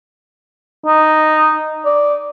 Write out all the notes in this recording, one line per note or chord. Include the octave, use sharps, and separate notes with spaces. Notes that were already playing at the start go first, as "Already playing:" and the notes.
D#4
D5